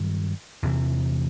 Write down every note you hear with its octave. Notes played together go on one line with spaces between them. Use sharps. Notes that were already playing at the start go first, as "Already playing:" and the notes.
Already playing: G2 D#3 F#3
E2 C3 E3